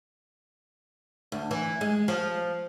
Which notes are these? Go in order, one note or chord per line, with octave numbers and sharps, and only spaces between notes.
D2
E3
G#3
F3